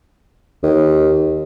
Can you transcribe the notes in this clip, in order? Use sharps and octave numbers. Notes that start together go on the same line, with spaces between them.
D#2